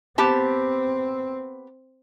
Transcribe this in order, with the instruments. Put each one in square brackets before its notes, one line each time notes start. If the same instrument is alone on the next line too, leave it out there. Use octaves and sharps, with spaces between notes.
[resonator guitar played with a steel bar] B3 G4 A5 [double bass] C4